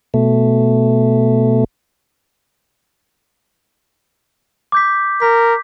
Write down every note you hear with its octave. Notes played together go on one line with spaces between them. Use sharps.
B2 A3
D6 G6 B6
A#4 B6